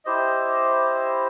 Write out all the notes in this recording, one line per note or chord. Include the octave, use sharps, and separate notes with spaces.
E4 G4 C5 D#5